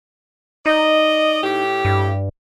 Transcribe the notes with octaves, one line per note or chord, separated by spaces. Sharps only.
D#4 D5 D#5
A2 G4
G2